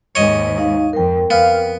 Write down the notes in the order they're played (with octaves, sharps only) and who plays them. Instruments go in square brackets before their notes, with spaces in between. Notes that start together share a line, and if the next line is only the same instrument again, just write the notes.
[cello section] D#2 G#2 [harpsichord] C#5 D#5
[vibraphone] D#4 F5
[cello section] F2 [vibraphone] A#4 G5
[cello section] F2 [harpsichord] B3 [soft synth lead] F5